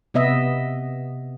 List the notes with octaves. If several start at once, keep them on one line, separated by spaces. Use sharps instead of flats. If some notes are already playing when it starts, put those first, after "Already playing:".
C3 B3 D#5 E5